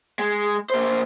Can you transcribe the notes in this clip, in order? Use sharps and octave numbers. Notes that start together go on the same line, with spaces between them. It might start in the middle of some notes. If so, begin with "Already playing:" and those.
G#3
A#2 C5